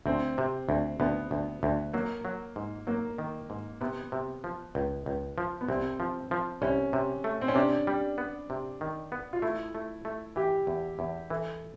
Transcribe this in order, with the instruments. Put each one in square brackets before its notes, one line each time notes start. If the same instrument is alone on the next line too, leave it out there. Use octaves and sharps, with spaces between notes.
[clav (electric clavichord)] D2 [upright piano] C4
[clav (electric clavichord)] C3
D2
[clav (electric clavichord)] D2 [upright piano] B3
[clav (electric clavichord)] D2
D2
[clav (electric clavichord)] F#3 [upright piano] A#3
[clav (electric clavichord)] F#3
G#2
[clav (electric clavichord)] F#3 [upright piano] A#3
[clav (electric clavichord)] D#3
G#2
[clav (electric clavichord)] C3 [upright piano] B3
[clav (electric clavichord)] C3
F3
C#2
C#2
F3
[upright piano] B3
[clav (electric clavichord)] C2 [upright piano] C4
[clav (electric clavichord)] F3
F3
[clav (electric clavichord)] C2 [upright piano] C#4
[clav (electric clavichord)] C3
A3
[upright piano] C4
C#4
[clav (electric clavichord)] C3 [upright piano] D4
[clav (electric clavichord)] G3
B3
C3
D#3
B3
[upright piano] F4
[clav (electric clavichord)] A3 [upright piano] E4
[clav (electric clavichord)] A3
A3
[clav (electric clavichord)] E3 [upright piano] G4
[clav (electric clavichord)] E2
E2
[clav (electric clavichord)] E3 [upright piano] A4